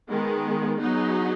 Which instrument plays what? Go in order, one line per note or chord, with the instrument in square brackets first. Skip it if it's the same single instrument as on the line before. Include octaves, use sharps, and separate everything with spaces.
[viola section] D#3 G#3 B3
F#3 B3 D#4 G#4